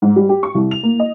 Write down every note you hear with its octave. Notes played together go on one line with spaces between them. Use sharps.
G#2
G3
G4
C#6
C2
F7
A#3
D#5